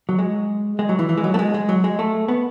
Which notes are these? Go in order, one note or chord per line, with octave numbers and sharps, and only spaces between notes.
F#3
G#3
G#3
F#3
E3
E3
G#3
F#3
A3
G#3
G#3
F#3
G#3
A3
B3